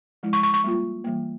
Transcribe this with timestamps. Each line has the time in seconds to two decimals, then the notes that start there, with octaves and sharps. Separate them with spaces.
0.23 F3 G#3 E4
0.33 C#6
0.43 C#6
0.54 C#6
0.64 G3 A#3 F4
1.04 E3 G3 A#3